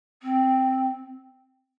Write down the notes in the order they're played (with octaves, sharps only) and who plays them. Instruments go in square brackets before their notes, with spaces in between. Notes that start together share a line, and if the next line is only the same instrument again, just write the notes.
[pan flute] C4